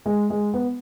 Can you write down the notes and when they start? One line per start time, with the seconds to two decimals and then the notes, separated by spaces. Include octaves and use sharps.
0.06 G#3
0.30 G#3
0.54 B3